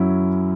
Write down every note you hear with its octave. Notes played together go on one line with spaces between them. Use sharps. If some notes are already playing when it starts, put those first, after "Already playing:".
Already playing: F#2 F#3 C#4 E4